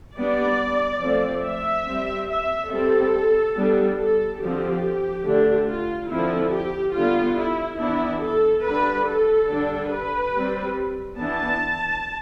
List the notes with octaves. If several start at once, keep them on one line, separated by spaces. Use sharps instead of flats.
G3 B3 D4 D5
F3 A3 C4
E5
G3 C4
E5
G3 C4 A4
G3 B3 D4
A4
D3 F3 C4 G4
D3 A3 D4
F4
D3 F3 C4 E4
G4
D3 G3 B3 F4
E4
E3 B3 D4 E4
A4
D3 G3 D4 B4
A4
D3 G3 D4
B4
G3 C4
E3 B3 D4 A5